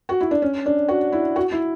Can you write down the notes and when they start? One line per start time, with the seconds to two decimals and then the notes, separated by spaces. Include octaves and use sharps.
0.09 F#4
0.21 E4
0.31 D4
0.42 C#4
0.66 D4
0.88 F#4
1.12 E4
1.36 F#4
1.52 E4